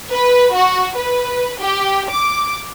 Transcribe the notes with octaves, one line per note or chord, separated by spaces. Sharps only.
B4
F#4
B4
G4
D6